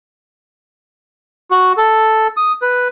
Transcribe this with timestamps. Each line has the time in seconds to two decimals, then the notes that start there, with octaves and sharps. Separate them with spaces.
1.51 F#4
1.77 A4
2.37 D#6
2.62 B4